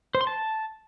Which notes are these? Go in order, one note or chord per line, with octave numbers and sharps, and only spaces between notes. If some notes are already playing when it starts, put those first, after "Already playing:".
C5
C6
A5